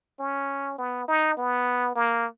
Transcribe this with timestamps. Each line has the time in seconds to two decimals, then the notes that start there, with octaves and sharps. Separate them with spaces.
0.20 C#4
0.79 B3
1.08 D#4
1.37 B3
1.96 A#3